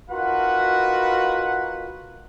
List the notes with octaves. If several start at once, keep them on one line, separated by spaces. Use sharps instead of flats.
D#4 F4 F#4 A#4 B4 F#5